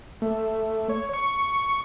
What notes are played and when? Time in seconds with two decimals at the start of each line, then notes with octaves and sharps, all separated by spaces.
0.22 A3
0.89 C#5
1.14 C#6